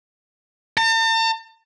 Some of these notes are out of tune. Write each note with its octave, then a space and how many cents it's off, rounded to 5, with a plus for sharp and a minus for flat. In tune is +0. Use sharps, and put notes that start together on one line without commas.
A5 +45